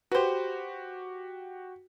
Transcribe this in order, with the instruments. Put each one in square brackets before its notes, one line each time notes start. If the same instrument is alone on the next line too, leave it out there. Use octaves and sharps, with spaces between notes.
[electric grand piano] F#4 G4 [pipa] B4 C5